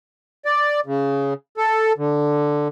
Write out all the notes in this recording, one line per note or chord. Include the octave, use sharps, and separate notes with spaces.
D5
C#3
A4
D3